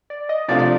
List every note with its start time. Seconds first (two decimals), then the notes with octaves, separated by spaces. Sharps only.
0.10 D5
0.29 D#5
0.48 C3 F3 A3 D4 F4 D5
0.59 D5